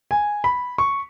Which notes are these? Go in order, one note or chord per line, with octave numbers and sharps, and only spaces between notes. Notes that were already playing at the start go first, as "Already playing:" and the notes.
G#5
B5
C#6